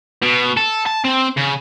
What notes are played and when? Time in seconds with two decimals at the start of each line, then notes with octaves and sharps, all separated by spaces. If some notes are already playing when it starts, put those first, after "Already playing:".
0.22 B2
0.57 A4
0.86 A5
1.05 C4
1.37 C#3